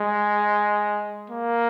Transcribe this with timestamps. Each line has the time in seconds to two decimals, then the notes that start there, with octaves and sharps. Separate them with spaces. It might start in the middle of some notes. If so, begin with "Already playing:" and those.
Already playing: G#3
1.30 A#3